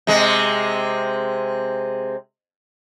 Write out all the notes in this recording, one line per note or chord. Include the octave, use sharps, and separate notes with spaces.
C3 G#3